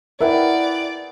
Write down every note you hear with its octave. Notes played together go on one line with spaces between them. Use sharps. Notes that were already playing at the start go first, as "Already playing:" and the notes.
E4 G#4 A#4 B4 D5 F#5 G5